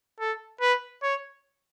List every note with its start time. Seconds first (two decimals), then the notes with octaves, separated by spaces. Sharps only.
0.20 A4
0.61 B4
1.03 C#5